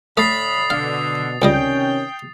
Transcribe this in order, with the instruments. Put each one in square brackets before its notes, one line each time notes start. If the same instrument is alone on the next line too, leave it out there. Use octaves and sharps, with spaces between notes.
[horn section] A2 D3 B5 [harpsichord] A3 [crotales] D#6 A6 C7
[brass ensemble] B2 [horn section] D3 [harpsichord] F5
[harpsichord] C#2 G3 D#5 [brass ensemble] C3 D#3 C#4 [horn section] G5